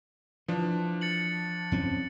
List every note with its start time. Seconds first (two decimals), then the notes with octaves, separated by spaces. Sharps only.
0.48 E3 F3 D4
1.01 A6 C#7 F#7
1.72 F2 C4 C#4